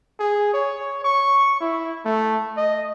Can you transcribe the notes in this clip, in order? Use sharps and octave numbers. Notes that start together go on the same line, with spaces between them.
G#4
C#5
C#6
E4
A3
D#5